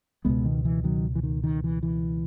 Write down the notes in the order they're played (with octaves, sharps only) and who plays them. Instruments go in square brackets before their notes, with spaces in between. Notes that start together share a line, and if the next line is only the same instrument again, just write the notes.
[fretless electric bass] C#2 B2 G#3 B3
D#3
E3
D#3 F#3
E3
D#3
D#3
E3
E3